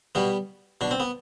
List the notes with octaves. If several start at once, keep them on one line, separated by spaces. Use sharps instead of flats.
B2 G3 B3
B2 D4
C4
B3